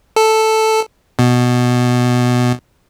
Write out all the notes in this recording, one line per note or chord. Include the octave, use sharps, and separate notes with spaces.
A4
B2